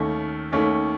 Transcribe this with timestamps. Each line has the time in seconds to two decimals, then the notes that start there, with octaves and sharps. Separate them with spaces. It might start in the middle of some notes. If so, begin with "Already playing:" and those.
Already playing: D#2 D#3 A3 C#4
0.52 D#2 D#3 A3 C#4